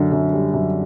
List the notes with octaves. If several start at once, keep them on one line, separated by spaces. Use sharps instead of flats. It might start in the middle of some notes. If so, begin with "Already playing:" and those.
Already playing: F#2 D3
F#2
G3
F#2